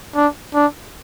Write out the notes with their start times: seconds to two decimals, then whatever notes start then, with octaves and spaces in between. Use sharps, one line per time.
0.15 D4
0.54 D4